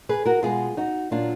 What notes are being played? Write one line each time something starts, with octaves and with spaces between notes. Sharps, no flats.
G#4 B4
F#4 A#4
B2 G#3 B3 F4 G#4
D#4 F#4
A#2 F#3 A#3 D4 F4